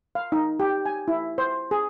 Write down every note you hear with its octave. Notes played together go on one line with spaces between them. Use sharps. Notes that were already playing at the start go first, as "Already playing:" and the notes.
F5
D#4
G4
G#5
E4
C5
G#4